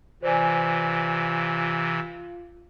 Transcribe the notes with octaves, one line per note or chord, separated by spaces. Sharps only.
C3 E3 F4 C5 D5 G#5